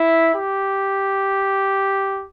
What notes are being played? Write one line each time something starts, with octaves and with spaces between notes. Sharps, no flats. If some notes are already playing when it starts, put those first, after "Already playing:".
Already playing: E4
G4